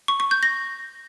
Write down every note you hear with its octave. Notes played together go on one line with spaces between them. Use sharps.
C#6
C#6
G6
A#6